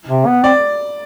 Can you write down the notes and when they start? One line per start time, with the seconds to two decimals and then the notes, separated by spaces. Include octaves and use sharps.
0.09 C3
0.26 B3
0.43 C4 D5